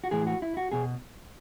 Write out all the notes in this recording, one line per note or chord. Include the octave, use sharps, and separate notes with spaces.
F#4
A2 E3 G#4
F#4
E4
F#4
B2 G#4